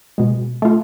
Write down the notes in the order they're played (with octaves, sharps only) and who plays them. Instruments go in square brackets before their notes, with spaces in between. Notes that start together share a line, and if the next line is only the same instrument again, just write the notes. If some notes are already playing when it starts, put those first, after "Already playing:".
[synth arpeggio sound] B2 G#3
A3 F4